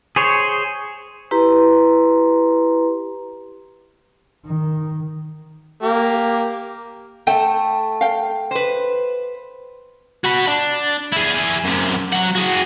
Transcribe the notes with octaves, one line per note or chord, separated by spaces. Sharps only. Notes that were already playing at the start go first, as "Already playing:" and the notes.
G#4 C5 C#5
E4 G4 B4 A#5 C6
D#3
A#3 G4
A3 G5
F5 G5
B4 C5
F#4 B5
D4
E4 G#4
F#2 C3
F#3 F#5
F#4 G#4